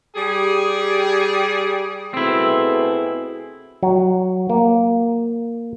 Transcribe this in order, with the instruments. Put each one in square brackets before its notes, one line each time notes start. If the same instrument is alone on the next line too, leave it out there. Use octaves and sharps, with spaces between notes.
[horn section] G3 G4 G#4
[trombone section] B2 A3 G#4 [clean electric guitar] C4 E4
[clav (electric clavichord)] F#3
A#3